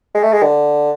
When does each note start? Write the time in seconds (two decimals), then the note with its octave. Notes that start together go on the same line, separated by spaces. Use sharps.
0.15 G#3
0.23 A3
0.33 G#3
0.42 D3